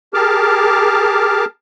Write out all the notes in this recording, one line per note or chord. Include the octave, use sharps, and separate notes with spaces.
G4 G#4 A#4 A5 D6 F6